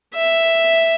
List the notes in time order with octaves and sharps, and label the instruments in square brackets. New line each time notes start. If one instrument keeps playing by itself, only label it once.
[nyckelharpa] E5